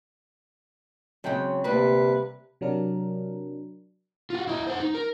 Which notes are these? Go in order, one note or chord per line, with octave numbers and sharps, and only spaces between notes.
C#3 F#3 G#3 C4 G5
D2 C3 G3 A#3 B4
C3 F#3 D4 A#4
F4 F#4
E4 D#5
C5 F#5
D#4
A#4